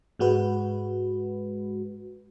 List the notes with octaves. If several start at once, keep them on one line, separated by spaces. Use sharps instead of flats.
G#2 G#3 F#4 B4